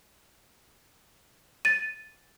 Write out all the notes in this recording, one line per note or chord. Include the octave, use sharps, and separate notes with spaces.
A6 D#7